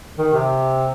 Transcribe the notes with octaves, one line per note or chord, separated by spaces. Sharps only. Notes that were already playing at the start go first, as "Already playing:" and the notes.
D#3
C3